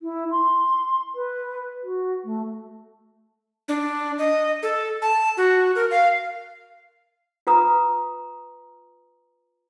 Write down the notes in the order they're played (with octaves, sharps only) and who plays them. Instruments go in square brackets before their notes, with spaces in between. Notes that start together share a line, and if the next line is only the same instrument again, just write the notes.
[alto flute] E4
C6
B4
F#4
A3
[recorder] D4
D#5
A4
A5
F#4
A#4
F5
[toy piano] F4 B4 A#5 D#6